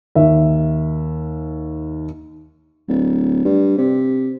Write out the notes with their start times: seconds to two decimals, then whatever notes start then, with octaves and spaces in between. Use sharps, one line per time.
0.15 D#2 E5
2.88 D1
3.45 G2
3.78 C3